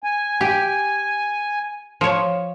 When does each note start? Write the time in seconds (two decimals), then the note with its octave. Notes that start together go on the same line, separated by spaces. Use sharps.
0.04 G#5
0.41 G4
2.01 F3 C#5